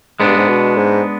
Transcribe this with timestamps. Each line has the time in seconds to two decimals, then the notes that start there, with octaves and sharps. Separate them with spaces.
0.20 G#2 G#3 B3 D4
0.28 G2
0.38 G#2
0.49 B2
0.77 G#2